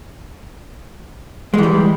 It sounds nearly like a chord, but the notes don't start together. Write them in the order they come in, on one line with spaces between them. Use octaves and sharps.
G#3 E3 G3